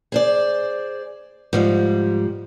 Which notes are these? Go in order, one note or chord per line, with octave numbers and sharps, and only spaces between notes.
G#4 C5 D5
G#2 F3 G3